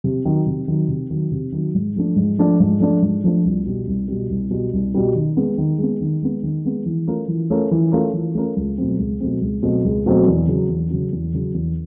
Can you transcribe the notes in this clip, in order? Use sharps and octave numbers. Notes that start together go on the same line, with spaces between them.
C3
D#3 F#3
C3
D#3 F#3
C3
D#3 F#3
C3
D#3 F#3
G#2
F3 A3 D4
G#2
F3 A3 D4
G#2
F3 A3 D4
G#2
F3 A3 D4
C2
B2 G3
C2
B2 G3
C2
B2 G3
C2
B2 G3
D#3
G#3 B3
D#3
G#3 B3
D#3
G#3 B3
D#3
G#3 B3
E3
A3 C#4 F4 A#4
E3
A3 C#4 F4 A#4
E3
A3 C#4 F4 A#4
E3
A3 C#4 F4 A#4
C#2
B2 F#3 A3 C4
C#2
B2 F#3 A3 C4
C#2
B2 F#3 A3 C4
C#2
B2 F#3 A3 C4
E2
C#3 F#3
E2
C#3 F#3
E2
C#3 F#3
E2